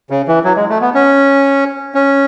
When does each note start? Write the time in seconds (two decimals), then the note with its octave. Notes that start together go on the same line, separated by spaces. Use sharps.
0.10 C#3
0.28 E3
0.44 F#3
0.56 G#3
0.70 A3
0.81 B3
0.94 C#4
1.95 C#4